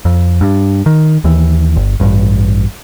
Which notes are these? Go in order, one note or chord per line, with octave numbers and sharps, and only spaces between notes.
F2
G2
D#3
D#2 E3
G1
A1 G2